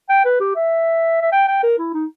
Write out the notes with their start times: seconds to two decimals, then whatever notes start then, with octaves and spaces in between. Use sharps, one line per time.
0.09 G5
0.25 B4
0.40 G4
0.55 E5
1.22 E5
1.32 G5
1.48 G5
1.63 A#4
1.78 E4
1.94 D#4